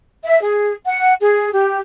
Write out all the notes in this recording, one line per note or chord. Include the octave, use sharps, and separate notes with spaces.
E5
G#4
F#5
G#4
G4